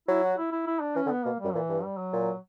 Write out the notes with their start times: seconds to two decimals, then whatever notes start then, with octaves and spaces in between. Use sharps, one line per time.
0.08 F#3 E4
0.24 F#4
0.38 E4
0.52 E4
0.67 E4
0.81 D4
0.95 E3 C#4
1.06 D3
1.11 B3
1.25 B2 A#3
1.40 F#2 G3
1.54 A#2 E3
1.69 G2
1.84 G3
1.98 F#3
2.13 A#2